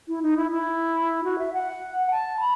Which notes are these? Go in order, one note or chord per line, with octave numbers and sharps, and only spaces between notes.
E4
D#4
E4
E4
F#4
E5
F#5
A5
B5